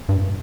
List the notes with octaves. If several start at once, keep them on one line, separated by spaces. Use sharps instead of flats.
G2